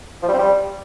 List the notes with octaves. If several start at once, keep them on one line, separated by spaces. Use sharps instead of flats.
F3
G3
C4
G3